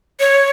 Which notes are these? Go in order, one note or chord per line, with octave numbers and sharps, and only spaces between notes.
C#5